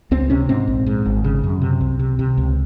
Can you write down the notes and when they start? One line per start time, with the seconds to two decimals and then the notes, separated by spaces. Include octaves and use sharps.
0.11 C#2 C4
0.30 C3 C#4
0.49 G#2 C4
0.68 A#1
0.86 G#2
1.05 G#1
1.24 C#3
1.44 F#2
1.62 C3
1.81 C2
1.99 C3
2.19 C3
2.37 C#2